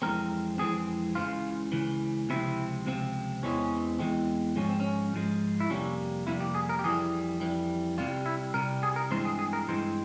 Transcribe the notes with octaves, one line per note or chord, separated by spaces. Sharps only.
F2 E3 G#3 C4 A#4
F2 E3 G#3 C4 G#4
C#2 C#3 E3 F4
C#2 C#3 E3
C#2 C3 F3 C4 E4
C#2 C3 F3 C4
E2 E3 G#3 C4 C#4
E2 E3 G#3 C4
G#2 F3 G#3 C#4
C4
C#4
G#2 F3 G#3
E4
F2 C3 G3 A#3 C#4
F2 C3 G3 A#3 E4
G4
G#4
A#4
G4
F2 E3 G3 G#4
F2 E3 G3
C2 C3 G3 F4
E4
C2 C3 G3 A#4
G#4
A#4
G2 E3 G#3 C4 C5
G#4
G#4
A#4
G2 E3 G#3 C4 C5